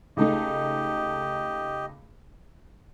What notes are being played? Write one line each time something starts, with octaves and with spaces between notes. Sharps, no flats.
C#2 A3 D#4 G4 D#5